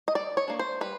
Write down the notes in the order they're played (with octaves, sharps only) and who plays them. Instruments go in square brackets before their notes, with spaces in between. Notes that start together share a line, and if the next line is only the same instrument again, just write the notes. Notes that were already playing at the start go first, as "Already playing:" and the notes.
[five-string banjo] D#5
G3 D5
C#5
A#3 D4
C5
G3 B4